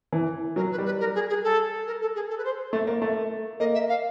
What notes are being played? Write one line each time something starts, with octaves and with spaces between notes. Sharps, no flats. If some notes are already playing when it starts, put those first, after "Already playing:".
E3
F#3 A#4
B4
G3
B4
A#4
G#4
G#4
A4
A#4
A4
G#4
A4
B4
C5
A3
A#3
A3
A#3 D#5
E5
F5